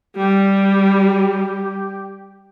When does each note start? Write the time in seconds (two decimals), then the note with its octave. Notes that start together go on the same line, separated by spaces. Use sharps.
0.17 G3 G4